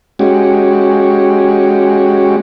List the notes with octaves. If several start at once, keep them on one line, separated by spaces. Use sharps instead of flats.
G#3 C#4 F#4 G4